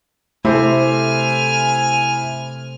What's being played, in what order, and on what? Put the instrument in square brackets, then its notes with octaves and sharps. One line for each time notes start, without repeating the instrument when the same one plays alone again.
[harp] C3 [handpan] A3 [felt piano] E4 C5 [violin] G#5 F6